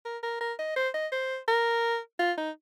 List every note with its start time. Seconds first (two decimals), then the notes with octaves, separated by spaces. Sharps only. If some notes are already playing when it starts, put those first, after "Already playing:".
0.05 A#4
0.23 A#4
0.41 A#4
0.59 D#5
0.76 C5
0.94 D#5
1.12 C5
1.48 A#4
2.19 F4
2.37 D#4